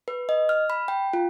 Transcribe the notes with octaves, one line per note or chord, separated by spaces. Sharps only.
B4
D#5
F6
B5
G5
F4